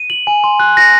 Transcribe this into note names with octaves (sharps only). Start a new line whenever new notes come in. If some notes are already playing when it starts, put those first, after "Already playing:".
Already playing: D#7
F#7
G#5
C6
F#6
A#6